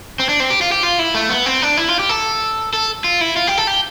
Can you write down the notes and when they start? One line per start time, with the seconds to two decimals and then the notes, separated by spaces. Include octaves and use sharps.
0.19 C4
0.29 D4
0.40 C4
0.50 G4
0.61 F4
0.72 G4
0.83 F4
0.99 E4
1.15 A3
1.30 B3
1.46 C4
1.62 D4
1.77 E4
1.89 F4
1.99 G4
2.09 A4
2.73 A4
3.04 F4
3.21 E4
3.36 F4
3.47 G4
3.58 A4
3.67 G4